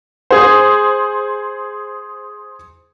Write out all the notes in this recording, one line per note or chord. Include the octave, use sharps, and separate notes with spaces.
G#4 C5